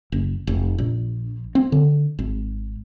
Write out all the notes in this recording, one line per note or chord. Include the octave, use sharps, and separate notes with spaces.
F#1
F1
A#1
C4
D3
G#1